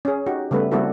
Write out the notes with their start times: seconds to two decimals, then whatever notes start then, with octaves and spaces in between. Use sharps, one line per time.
0.05 C#4 G#4
0.26 D#4 F#4 G4
0.51 C#3 G3 A3 B3 B4
0.71 G3 A#3 C4 E4 F#4 A4